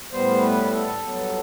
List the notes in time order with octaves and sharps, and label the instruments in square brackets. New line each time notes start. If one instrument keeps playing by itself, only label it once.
[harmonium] A2 G3 B3 C5
B4
A4
G2 F#3 B3